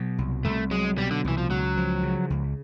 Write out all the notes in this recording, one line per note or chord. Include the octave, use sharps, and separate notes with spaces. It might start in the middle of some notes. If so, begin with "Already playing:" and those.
Already playing: B2 F#3
C2
C2 A3
F#3 G#3
B2 G3
D3
C2 E3
F3
C#2 F#3
F3
C#3
C#2